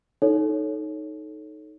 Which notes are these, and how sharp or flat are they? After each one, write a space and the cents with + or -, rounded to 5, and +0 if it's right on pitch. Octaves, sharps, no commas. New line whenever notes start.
D#4 +0 A4 -15 C#5 +0